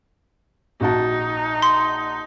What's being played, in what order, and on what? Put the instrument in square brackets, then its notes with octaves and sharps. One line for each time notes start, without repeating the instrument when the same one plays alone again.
[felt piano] A#1 F#4 A5 [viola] D#4
[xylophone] C6